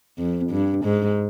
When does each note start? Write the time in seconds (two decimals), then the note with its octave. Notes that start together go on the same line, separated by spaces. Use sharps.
0.18 F2
0.51 G2
0.85 G#2